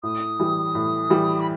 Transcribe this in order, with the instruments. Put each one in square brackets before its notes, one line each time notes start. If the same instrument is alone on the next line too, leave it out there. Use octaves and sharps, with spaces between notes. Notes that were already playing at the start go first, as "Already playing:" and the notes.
[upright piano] A2 [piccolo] D#6
[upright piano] E3 G3
A2
E3 G3
[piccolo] B5